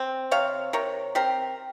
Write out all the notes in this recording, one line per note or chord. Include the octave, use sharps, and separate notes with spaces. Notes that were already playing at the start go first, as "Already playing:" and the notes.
Already playing: C4
C3 C#5 F5
C3 A#4 C#5
C4 G4 A#4